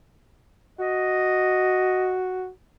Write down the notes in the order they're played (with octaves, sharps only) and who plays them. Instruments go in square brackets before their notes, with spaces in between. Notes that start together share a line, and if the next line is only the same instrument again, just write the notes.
[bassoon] F#4 [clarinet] D#5